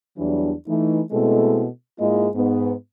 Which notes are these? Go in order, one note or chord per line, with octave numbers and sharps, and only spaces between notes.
E2 E3 F#3 G3 D4
E3 A3 D#4
B2 G#3 A3 C4 E4 A4
G#2 G#3 A#3 E4 F4 D#5
G#2 B3